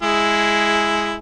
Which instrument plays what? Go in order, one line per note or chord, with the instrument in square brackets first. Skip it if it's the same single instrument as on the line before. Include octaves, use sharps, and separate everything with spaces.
[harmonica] G#3 E4 G#4